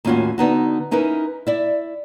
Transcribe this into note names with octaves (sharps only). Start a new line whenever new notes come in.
D#2 A2 C#4 F4 F#4 G#5
D3 B3 D#4 F#4
C#4 D#4 E4 A#4 B4
E4 D5 E5